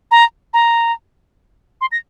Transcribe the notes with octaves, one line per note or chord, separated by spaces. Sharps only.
A#5
A#5
C6
A#6